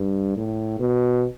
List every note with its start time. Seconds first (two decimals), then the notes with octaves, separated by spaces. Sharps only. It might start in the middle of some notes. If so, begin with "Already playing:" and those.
Already playing: G2
0.36 A2
0.79 B2